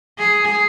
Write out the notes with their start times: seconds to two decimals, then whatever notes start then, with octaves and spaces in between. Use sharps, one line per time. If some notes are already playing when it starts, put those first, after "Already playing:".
0.19 G#4